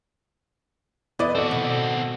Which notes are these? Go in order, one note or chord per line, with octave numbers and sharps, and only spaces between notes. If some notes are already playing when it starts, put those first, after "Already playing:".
E2 B3 E4 D5 D#5
C4 F#4 A4
B2